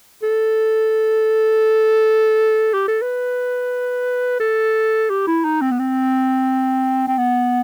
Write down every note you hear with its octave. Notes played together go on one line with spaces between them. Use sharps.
A4
G4
A4
B4
A4
G4
E4
D#4
C4
B3
C4
C4
B3